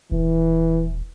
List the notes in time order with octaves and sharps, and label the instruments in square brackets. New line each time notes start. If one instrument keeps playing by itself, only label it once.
[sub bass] D#1 [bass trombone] E3